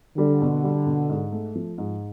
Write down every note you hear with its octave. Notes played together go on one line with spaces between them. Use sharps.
D3 G3
B2
G3
B2
G#2
A3
F3
G#2